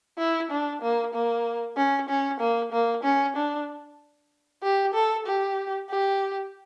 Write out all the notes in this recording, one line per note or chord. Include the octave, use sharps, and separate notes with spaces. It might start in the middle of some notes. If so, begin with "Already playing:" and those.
E4
D4
A#3
A#3
C#4
C#4
A#3
A#3
C#4
D4
G4
A4
G4
G4